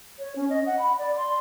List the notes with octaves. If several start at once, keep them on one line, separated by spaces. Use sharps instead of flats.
C#5
C#4
D#5
F#5
B5
D5
C6